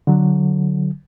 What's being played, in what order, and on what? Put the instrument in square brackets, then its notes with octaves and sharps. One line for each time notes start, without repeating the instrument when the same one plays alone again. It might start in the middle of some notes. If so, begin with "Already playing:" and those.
[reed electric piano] D3 F#3